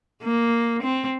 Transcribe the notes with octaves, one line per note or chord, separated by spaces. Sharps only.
A#3
C4